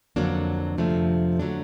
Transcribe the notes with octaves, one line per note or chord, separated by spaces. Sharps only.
F2 D3 F#3 A#3 D4
F2 C3 F3 A3
D3 F#3 A3 D4